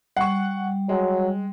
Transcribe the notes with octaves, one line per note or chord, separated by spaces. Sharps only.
G3 F#5 C#6
F#3 G#3